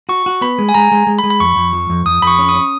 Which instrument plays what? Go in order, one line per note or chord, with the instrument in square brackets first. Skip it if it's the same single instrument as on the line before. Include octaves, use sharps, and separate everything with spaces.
[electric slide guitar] F#4 [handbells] C#6
[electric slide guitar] F#4
[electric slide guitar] B3 [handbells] B5
[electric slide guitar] G#3
[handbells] G#5
[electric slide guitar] G#3 [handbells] A#5
[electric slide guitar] G#3
G#3
[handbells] B5
[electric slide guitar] G#3
[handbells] B5
[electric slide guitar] F2 [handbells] C#6
[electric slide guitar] F2
F3
F2
[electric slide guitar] F2 [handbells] D#6
[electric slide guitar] F2 [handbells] B5
[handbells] C#6
[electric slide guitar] C#4
[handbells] D#6
[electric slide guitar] C#4